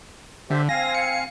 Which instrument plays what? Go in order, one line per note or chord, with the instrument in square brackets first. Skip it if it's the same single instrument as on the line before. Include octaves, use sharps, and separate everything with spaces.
[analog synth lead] D3 [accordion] G4 C5 E5
[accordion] C4 F5 G#5 [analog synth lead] A#6
[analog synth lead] C#7